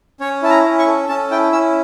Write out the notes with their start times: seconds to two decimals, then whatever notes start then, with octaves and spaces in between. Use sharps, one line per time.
0.20 C#4 C#5
0.43 E4 A5
0.50 A#5
0.64 C#4
0.79 C#6
0.87 A4
1.08 C#4 A5
1.31 E4 G5
1.52 C#4 E6